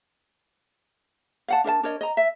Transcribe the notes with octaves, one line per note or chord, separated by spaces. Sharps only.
F5 F#5 A5
D4 A#4 E5 A5
D4 A#4 C#5 D#5
D#5 A#5
E5